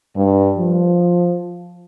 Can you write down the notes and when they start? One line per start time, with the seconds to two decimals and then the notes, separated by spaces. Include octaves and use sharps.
0.15 G2
0.57 F3